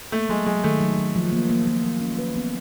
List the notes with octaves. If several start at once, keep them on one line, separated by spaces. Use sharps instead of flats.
A3 A#3
F#3 G#3
F#3 G#3
D#3 A3
F#3
F#3
F3
A#3
A#3
A#3
F3
C#4
B4
B3